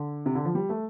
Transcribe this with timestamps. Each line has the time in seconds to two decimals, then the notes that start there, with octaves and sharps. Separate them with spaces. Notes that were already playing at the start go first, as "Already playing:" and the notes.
Already playing: D3
0.26 C3
0.35 D3
0.45 F3
0.55 G3
0.69 A3